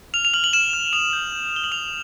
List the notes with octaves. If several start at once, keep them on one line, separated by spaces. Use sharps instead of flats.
F6 F7
F7
F6 F#7
F#7
F6 E7
F6
D#6 F7
G6
G6
G6 G7
F#7
D#6 F7